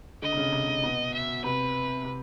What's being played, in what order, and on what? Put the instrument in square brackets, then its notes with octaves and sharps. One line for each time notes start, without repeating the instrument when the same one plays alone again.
[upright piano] D3 [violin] D#5
[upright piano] C3
C#3
C3
C3
B2
[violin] E5
[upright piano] C3 [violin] B4
[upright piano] C3